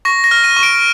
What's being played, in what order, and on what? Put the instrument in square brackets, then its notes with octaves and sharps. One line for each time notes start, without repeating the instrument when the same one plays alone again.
[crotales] C#6 A#6
A#6
F6
D#7
C#6
D7